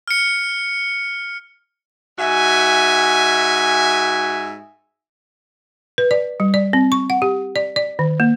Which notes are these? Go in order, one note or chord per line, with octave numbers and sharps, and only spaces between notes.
F6 C#7
G#2 F#4 E5 G#5
B4
D5
G3
D5
C4
C#6
F#5
G4
D5
D5
D#3
A#3